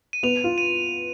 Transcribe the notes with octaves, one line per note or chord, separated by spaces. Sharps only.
D#7
B3 F7
F4
D#7